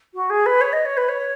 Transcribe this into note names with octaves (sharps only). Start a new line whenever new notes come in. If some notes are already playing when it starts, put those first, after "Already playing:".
F#4
G#4
B4
C#5
D#5
C#5
B4
C#5